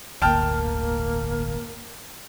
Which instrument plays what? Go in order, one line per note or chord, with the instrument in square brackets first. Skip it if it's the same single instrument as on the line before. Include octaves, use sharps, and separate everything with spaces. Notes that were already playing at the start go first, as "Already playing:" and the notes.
[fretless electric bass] D1 G1 D2 [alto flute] A#3 [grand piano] G5 A5 F6